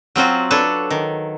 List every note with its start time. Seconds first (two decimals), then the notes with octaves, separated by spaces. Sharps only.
0.16 F#3 C4 F4 F#4
0.51 D4 A4 B4 C#5
0.90 D#3